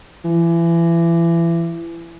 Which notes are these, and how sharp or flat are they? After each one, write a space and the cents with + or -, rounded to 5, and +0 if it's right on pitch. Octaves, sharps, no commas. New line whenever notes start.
E3 +30